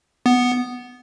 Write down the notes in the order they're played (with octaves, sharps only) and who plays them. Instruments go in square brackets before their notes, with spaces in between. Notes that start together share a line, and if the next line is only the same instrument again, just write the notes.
[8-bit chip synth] B3